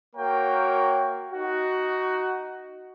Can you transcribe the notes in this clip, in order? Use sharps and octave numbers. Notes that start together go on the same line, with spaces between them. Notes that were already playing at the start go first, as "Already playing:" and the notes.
A#3 F#4 A#4 C#5 G5
D#4 F#4